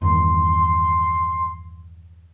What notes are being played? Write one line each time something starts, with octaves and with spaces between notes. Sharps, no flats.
E2 G2 D#3 C6